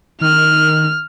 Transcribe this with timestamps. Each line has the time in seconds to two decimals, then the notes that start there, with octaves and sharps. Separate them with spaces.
0.21 D#3 F6